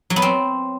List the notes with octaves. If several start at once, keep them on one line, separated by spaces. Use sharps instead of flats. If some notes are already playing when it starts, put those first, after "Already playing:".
F#3
B3
C4